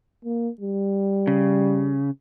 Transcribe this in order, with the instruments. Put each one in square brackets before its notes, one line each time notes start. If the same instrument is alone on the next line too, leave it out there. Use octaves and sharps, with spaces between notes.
[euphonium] A#3
G3
[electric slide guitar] C#3